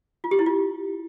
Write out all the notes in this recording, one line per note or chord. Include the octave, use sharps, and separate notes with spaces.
F4
G4
E4
F4